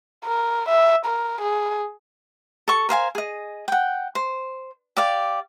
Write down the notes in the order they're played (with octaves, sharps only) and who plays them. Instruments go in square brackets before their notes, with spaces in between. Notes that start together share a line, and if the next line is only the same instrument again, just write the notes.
[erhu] A#4
E5
A#4
G#4
[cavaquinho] A4 C#6
A#4 C5 F5 G#5
G#4 D#5
F#5 G5
C5
G4 D5 F5